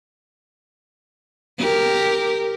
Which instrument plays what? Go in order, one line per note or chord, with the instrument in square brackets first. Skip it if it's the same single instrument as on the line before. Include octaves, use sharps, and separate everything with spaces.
[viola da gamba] G4 A#4